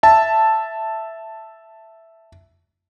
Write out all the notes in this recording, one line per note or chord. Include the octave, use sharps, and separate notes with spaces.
E5 A5